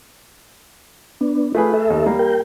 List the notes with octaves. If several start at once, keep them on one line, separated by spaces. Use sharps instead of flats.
B3 D4
A3 F4 G#4 B4
A4 E5
D#2
G3 A#3
A#4 G5